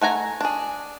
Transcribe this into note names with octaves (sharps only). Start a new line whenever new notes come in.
A3 F#5 G#5 A#5
D4 G#4